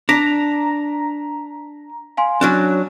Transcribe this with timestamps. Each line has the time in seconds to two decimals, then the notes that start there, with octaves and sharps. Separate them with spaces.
0.09 D4 A#5 B6
2.17 F5 G#5 C6
2.41 F#3 C#4 D4 G#5 F#6